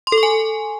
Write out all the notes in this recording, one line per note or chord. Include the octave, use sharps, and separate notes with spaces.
C6
A4
C#6
G#5